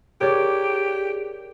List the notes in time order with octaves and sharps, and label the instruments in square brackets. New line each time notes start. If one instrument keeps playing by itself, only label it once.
[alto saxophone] G4 [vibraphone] G#4 [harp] A#4 C#5 D5